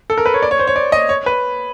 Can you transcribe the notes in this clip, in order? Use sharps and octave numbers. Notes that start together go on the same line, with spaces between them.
A4
A#4
B4
C#5
D5
C#5
C5
C#5
D5
D#5
C#5
B4